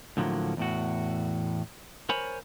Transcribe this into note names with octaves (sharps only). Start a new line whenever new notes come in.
A2 D3 F3 F#3 A3 A#3
E2 A2 F#4
A#4 C5 C#5 G#5 B5